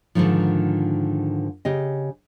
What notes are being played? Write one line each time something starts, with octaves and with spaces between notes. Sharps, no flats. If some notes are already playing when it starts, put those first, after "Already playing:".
G#2 B2 D3 D#3 F3
C#3 G4 D#5